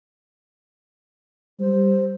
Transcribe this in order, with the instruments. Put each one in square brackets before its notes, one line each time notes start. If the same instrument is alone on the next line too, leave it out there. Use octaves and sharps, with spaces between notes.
[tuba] G3 [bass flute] C5